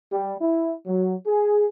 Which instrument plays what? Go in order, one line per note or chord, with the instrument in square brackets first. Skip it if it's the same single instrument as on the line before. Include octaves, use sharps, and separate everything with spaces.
[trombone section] G3
E4
F#3
G#4